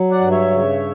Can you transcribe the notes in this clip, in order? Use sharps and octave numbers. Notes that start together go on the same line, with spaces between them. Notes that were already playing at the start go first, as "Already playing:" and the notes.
Already playing: F#3
D5 F#5
G2
C#5 E5
C#3